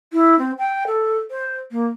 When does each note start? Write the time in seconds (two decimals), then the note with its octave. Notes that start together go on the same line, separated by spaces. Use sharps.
0.13 E4
0.39 C4
0.59 G5
0.87 A4
1.31 C5
1.71 A#3